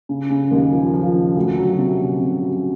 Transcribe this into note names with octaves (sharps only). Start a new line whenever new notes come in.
C#3
C#3
D#2
F3
F3
C#3
D2
F#3
C3
C3
C3
F#3